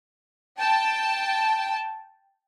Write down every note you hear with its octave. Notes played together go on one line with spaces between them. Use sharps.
G5 A5